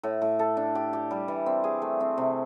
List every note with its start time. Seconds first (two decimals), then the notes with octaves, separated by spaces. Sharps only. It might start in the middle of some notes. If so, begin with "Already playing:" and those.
0.03 A2
0.22 A2
0.39 A4
0.57 D4
0.75 G4
0.93 G4
1.11 G3
1.28 E3
1.46 C4
1.64 G#4
1.82 A3
2.00 C4
2.18 C3